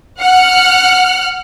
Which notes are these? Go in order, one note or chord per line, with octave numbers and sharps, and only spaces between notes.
F#5 F6 F#6